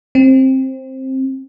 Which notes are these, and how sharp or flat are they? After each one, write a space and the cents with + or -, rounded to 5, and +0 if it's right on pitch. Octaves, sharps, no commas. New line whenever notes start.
C4 +15